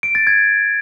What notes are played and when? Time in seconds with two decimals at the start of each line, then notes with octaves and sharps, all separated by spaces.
0.03 D7
0.15 A6
0.27 G#6